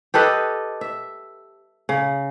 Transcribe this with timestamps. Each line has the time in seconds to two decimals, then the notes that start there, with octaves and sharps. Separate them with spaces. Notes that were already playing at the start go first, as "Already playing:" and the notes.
0.14 G4 A4 B4 D#5
0.81 E5
1.89 C#3